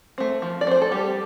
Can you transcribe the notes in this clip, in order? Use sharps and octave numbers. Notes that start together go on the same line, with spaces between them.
A3 C4
F3
D5
A3 C4 C5
A4
G3 G4